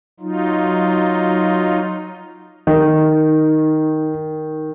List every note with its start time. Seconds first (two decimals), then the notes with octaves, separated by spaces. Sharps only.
0.20 F#3 D#4 F4
2.67 D#3 D#4